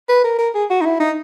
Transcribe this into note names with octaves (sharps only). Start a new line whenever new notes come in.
B4
A#4
A#4
G#4
F#4
D#4
E4
D#4